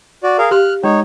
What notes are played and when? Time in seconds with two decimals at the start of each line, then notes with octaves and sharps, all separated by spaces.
0.23 F#4 D5
0.38 G#4 A#4 F5
0.51 G4 F5 C6 F6 F#6
0.84 G#3 D#4 C#5